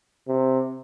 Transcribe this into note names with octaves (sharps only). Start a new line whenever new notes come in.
C3